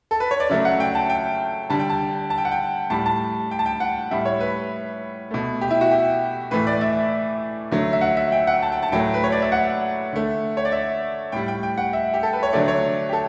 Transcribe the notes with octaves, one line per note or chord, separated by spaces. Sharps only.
A4
B4
C#5
D5
C#3 F#3 A3 E5
F#5
G5
A5
G5
D3 G3 A5
G5
A5
A5
G5
F#5
G5
A2 G3 A5
A5
G5
A5
G5
F#5
A2 G3 E5
C#5
B4
B2 A3
G4
E4
F#4
G4
A2 E3 A3 B4
D5
E5
D3 F#3 A3
E5
F#5
E5
G5
F#5
A5
G5
A5
A2 F#3 A3 G5
B4
C#5
D5
E5
F#5
D3 A3
C#5
D5
E5
A2 G3 G5
G5
G5
F#5
E5
G4
A4
B4
C#5
D3 F#3 A3 D5
C#5
G4
A4